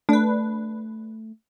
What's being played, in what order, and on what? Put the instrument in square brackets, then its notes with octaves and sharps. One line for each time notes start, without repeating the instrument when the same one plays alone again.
[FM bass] A3 [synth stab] D4 B4